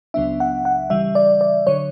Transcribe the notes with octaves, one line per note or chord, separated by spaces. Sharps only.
C#2 C#3 F#3 B3 D4 E5
F#5
F#5
C#3 E3 G3 E5
D5
D5
D3 F#3 C#5